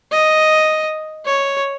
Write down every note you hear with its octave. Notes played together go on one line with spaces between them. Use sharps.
D#5
C#5